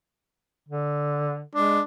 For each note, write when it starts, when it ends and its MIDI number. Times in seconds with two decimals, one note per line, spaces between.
0.69 1.41 50
1.55 1.79 56
1.55 1.81 62